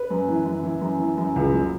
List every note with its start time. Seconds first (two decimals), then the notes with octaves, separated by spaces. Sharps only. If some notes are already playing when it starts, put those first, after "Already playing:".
Already playing: B4
0.10 F#2
0.28 E3
0.46 F#2
0.63 E3
0.81 F#2
0.99 E3
1.17 F#2
1.36 C#2
1.54 F#3